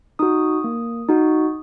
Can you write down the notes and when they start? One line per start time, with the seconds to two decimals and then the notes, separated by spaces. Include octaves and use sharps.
0.19 D#4 F#4 D#6
0.64 A#3
1.09 D#4 F#4